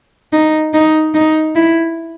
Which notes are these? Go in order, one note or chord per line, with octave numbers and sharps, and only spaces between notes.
D#4
D#4
D#4
E4